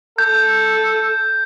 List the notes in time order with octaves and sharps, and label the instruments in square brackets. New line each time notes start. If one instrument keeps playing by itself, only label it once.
[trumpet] A4 [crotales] G6